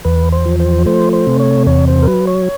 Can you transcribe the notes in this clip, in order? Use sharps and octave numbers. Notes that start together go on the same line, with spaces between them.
E2 B4
C5
F3
C5
A3 C5
C5
C3
C#5
E2 C#5
C5
A#4
F#3 B4
C#5